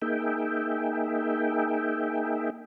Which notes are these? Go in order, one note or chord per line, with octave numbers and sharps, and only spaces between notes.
A#3 D#4 G#4 E5 G5